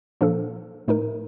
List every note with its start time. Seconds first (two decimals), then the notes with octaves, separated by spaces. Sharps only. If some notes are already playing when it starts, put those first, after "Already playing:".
0.21 A#2 F3 A#3 D4 A4
0.88 A2 A3 D#4 A#4